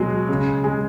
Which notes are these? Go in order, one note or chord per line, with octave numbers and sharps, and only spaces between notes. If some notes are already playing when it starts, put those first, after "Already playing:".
Already playing: B2 F#3 G#3
C#3
G#3